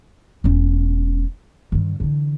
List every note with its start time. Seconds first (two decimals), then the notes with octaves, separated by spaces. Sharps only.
0.44 E1 C#4
1.72 G2 D#3
2.00 D3 E3